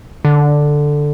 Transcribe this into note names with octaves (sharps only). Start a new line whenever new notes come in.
D3